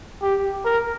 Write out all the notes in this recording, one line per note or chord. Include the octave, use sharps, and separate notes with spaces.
G4
A#4